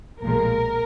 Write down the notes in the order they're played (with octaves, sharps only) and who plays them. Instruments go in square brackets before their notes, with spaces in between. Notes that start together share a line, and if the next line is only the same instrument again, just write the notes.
[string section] B1 A#2 F3 G#3 A#4